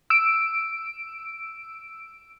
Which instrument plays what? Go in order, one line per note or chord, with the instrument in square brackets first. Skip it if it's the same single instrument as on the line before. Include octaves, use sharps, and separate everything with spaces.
[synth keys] E6 D7